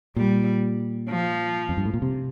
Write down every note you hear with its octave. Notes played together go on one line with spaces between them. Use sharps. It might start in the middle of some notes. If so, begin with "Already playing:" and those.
A#2 G3
F3
F2
G2
A2
A#2
C3